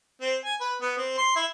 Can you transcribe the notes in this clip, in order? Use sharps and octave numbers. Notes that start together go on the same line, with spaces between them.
C4
G#5
B4
B3
C4
C6
E4